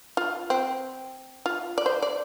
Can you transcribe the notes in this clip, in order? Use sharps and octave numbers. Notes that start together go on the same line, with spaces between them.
F4
C4
F4
D5
C5
D5